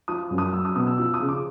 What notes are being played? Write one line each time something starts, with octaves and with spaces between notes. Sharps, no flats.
F3 D#6
F#2
D#6
F#3 E6
D#6
B2 D#6
E6
F3 E6
D#6
C#3
D6